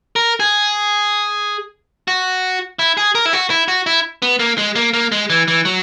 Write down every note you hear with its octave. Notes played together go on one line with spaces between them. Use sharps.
A#4
G#4
F#4
E4
G#4
A#4
E4
F#4
E4
F#4
E4
B3
A#3
G#3
A#3
A#3
G#3
E3
E3
F#3